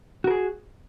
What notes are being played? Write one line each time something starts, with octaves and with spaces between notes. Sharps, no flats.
F#4 G#4 A#4